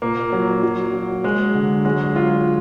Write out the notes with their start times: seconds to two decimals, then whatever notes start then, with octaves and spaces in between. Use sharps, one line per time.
0.02 A#2 A#3
0.32 F#3
0.63 F#3
0.94 F#3
1.24 F#3 G#3
1.54 D3
1.85 F#3 G#3
2.15 F#3 F4